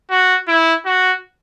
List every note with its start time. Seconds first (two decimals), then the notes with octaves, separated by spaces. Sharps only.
0.10 F#4
0.48 E4
0.86 F#4